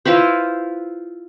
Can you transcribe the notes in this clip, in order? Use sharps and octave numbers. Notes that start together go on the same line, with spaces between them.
E4 F4 B4 C5